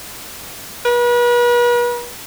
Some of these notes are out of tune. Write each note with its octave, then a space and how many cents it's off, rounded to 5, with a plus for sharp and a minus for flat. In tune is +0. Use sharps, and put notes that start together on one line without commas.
B4 -40